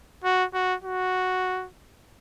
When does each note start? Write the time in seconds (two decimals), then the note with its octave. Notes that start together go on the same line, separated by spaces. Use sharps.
0.24 F#4
0.54 F#4
0.84 F#4